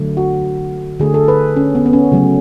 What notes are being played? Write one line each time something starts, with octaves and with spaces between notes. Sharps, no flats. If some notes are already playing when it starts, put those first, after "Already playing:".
Already playing: D3 F#3 A3
F#4
D3 A3 G#4
A4
B4
C#4
B3
B3
C#4
C#3 F#3 A3